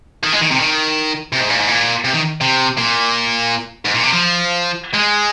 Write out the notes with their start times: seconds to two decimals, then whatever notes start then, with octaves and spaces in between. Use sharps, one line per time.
0.23 D#3
0.33 G#3
0.41 D#3
0.51 C3
0.60 D#3
1.33 C3
1.41 G#2
1.50 A#2
1.59 G#2
1.68 A#2
2.05 C3
2.14 D#3
2.41 C3
2.78 A#2
3.85 G#2
3.95 A#2
4.04 C3
4.13 F3
4.94 G#3